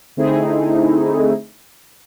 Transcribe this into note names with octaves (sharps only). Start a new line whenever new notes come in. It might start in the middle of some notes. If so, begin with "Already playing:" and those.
D3 A3 C4 D#4 E4 G#4